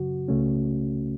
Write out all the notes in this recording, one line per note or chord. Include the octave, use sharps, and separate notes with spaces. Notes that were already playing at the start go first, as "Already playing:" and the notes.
Already playing: F#2 C#3 F#3 F#4
C#2 C#3 A3 C#4